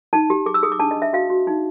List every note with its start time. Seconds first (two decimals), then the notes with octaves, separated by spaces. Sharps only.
0.13 D#4 A5
0.30 G4
0.46 G#4 D6
0.54 E6
0.63 G#4 D#6
0.72 D6
0.80 D4 A5
0.91 D#5
0.97 D4
1.02 E5
1.13 F#4 F5
1.30 F#4
1.47 D#4